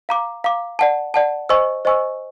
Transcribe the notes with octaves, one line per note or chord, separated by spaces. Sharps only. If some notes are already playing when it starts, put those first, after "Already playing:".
F5 A#5 D6
F5 A#5 D6
D5 F#5 A5
D5 F#5 A5
C5 D#5 G#5 C#6 E6
C5 D#5 G#5 C#6 E6